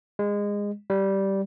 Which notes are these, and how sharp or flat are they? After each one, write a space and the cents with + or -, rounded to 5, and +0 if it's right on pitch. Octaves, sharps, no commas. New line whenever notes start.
G#3 -20
G3 -10